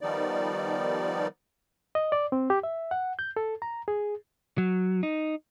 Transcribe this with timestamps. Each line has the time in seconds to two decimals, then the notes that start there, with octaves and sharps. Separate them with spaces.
0.01 D#3 F3 G3 B3 D#4 D5
1.95 D#5
2.12 D5
2.32 C4
2.50 G4
2.63 E5
2.91 F#5
3.19 G6
3.37 A4
3.62 A#5
3.88 G#4
4.58 F#3
5.03 D#4